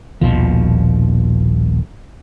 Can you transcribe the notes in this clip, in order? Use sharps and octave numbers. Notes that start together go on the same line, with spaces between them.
D#1 A#1 B2 F3